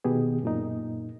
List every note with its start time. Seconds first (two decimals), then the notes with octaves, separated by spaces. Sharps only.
0.04 B2 D#3 B3 G4 G#4
0.43 F#2 A#2 D#4